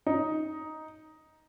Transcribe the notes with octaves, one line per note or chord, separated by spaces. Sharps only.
D#4